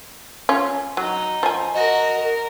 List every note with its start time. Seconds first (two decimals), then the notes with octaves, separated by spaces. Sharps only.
0.49 C#4 F4
0.97 F#3 D#4
1.43 F3 G#5
1.74 F#4 A#4 D#5
2.18 A#4